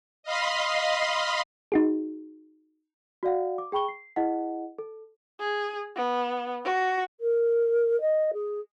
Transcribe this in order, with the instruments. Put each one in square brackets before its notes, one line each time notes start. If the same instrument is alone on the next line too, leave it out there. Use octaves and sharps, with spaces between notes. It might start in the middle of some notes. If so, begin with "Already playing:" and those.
[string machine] D#5 F5 B5 C6
[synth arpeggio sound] D#4 F#4 G#4
[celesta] F#4 D5 F5 F#5
D6
G#4 G5 B5 C#6 G7
C7
E4 G#4 D#5 F#5
A4
[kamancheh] G#4
B3
F#4
[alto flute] A#4
D#5
G#4